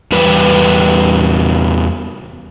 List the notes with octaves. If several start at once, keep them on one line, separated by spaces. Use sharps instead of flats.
E2 G3 B4